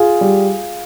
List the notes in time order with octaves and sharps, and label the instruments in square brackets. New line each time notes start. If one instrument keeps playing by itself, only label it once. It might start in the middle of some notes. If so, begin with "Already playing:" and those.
Already playing: [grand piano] F4 G#4
G3